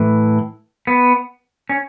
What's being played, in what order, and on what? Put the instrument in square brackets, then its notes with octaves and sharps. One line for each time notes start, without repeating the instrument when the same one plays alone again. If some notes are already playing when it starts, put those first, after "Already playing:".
Already playing: [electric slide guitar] A2 E3
B3
C#4